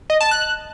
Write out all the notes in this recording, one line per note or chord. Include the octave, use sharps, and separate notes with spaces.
D#5
A5
F#6